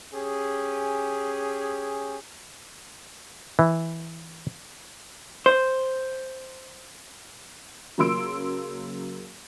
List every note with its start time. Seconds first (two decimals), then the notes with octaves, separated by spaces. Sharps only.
0.14 C#4 G4 G#4
3.59 E3
5.46 C5
7.98 C#3 F#3 A#3 C6 E6 D7